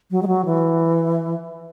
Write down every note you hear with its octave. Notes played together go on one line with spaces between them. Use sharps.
F#3
G#3
F#3
E3